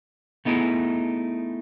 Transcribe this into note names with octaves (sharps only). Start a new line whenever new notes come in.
A3 B3 D#4 E4 G#4